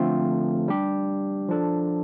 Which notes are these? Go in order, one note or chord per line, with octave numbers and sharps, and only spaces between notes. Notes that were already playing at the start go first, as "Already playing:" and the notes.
Already playing: D3 F3 A3 C4 F4
G3 D4 G4
F3 D4 A4